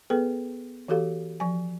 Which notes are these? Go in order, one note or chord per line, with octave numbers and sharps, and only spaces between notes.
B3 G#4 A4 B4 G5
E3 F#4 G4 A4 F5
F3 G#5